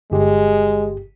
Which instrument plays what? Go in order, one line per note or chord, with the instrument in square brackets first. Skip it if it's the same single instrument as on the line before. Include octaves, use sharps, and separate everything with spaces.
[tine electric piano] G1 G4 [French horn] G#3